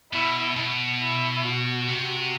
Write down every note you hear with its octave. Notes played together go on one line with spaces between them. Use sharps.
B2 E4
B2
E4
F#4
C3